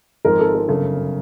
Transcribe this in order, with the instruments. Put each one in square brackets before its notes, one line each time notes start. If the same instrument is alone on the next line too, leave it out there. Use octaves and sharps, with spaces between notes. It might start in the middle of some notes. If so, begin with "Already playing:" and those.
[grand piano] G#1 G#2 F3 G#3 [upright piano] A#4
[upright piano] A4
A#4
[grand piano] G1 F#2 C#3 [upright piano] A4